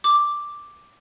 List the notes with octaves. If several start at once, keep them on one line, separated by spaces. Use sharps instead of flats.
D6